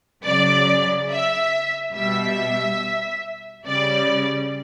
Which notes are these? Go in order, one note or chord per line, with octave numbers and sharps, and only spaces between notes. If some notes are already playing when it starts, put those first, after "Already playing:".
C#3 F#3 D5
E5
B2 G3 E5
C#3 G3 D5